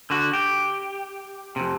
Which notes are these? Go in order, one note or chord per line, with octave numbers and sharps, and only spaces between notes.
D3 F#4
G4
F2 C3